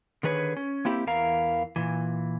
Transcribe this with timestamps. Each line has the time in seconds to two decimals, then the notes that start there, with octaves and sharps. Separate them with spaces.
0.23 D3 D#3 G#4 B4 C#5
0.57 C#4
0.85 A#3 C4 E4 G4
1.07 E2 E3 A#4 F5 A#5
1.76 A#2 E3